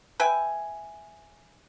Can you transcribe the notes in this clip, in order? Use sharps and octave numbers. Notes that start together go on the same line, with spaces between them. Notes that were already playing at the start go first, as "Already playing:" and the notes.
B4 E5 G5 G#5